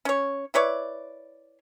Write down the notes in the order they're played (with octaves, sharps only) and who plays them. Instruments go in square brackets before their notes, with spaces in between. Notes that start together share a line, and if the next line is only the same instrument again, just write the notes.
[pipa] C#4 C#5
E4 B4 C#5 D5